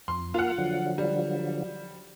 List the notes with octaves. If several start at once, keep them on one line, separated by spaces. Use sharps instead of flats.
F2 C6
A#3 F4 F5 F#5
D3 F3 F#3
G3